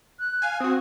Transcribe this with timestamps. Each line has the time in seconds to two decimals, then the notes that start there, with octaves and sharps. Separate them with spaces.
0.20 F#6
0.42 F5 G#5
0.60 C4 F#4 D#6